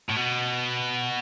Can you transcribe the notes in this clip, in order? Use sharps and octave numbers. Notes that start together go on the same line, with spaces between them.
A2
B2